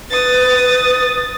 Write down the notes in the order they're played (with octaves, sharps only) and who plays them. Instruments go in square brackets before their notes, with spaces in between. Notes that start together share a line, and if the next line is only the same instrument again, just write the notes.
[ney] B4 [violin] D#6 A6